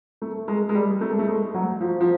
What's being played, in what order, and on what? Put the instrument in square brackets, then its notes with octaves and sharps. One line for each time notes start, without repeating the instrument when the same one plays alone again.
[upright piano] A3
G#3
G#3
G3
A3
G#3
A3
G#3
F#3
F3
F3